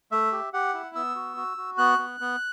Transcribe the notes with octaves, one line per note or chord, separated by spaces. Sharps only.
A3 E5
G4
G4 F#5
E4
B3 E6
F#4
F#4
F#4
B3 F#6
B3
B3